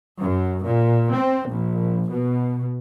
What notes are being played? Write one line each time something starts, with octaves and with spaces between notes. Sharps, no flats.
F#2
A#2
C4
A#1
B2